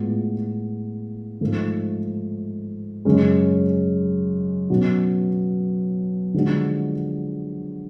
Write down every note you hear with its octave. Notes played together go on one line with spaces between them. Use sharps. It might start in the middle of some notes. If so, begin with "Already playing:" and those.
Already playing: A2 G#3 B3 F4
G#2 F3 A3
F#2 C#3 G#3 C#4
B2 F#3 C#4
D3 F3 G#3 D4 F#4